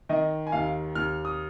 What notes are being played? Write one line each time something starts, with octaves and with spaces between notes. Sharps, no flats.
D#3 D#5
G#5
D#2 F5
D#2 F6
D#6